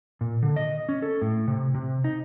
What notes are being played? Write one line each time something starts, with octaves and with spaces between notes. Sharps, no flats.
A#2
D3
D#5
C#4
A4
A2
C3
C3
D#4